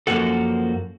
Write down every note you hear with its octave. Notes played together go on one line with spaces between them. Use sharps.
F#2 C#3 F3 A#3 F#4 A4